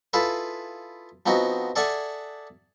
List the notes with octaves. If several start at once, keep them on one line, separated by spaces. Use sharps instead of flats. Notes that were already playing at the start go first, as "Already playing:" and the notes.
E4 F4 G#4 A4 B4
F3 B3 C4 D#4 F#4
G#4 A4 D5 E5 F#5 G#5